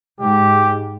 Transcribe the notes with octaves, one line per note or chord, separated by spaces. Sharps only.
G#2 G4